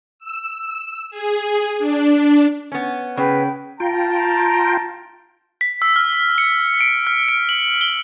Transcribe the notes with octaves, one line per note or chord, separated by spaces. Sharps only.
E6
G#4
D4
B3 C#4
C#3 B4 G5
F4 G5 A5 A#5
B6
E6
F6
C#7
D7
F6
D7
F#7
G7